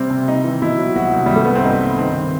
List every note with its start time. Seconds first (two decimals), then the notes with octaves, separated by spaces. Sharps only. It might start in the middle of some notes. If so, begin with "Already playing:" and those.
Already playing: C3 G3 C4
0.10 C3
0.28 G3 D#4
0.44 E3
0.62 B2 E4
0.78 F#3
0.95 C2 F#4
1.13 C2
1.26 G2 G3
1.36 A3
1.45 G3 B3
1.55 C4
1.64 G2 D#4
1.81 G2
1.98 D#3 C4
2.15 D#3